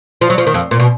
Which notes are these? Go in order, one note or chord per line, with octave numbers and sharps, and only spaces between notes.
F3
F#3
F3
D#3
F2
A#2
B2